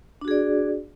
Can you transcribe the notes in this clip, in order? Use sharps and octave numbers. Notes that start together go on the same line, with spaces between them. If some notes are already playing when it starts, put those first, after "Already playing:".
D4 F#4 G#4 D5